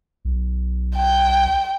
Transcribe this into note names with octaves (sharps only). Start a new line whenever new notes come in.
B1
G5